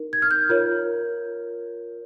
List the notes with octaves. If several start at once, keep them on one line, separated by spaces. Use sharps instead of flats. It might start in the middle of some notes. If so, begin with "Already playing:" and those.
Already playing: D#4 A#4
G#6
F6
G6
F4 A#4 C#5